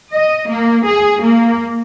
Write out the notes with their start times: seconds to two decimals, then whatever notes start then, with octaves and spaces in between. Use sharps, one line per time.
0.13 D#5
0.49 A#3
0.86 G#4
1.22 A#3